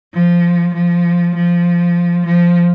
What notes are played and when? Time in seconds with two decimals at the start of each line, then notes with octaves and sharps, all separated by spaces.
0.14 F3
0.74 F3
1.35 F3
2.26 F3